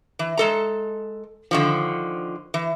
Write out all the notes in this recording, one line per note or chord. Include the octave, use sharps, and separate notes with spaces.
E3
G#3 A4 A#5
D3 D#3 F3
E3